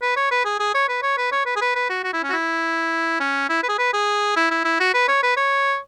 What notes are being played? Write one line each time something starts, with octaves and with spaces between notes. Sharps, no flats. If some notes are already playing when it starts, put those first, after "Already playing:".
B4
C#5
B4
G#4
G#4
C#5
B4
C#5
B4
C#5
B4
G#4
B4
B4
F#4
F#4
E4
C#4
F#4
E4
C#4
E4
B4
G#4
B4
G#4
E4
E4
E4
F#4
B4
C#5
B4
C#5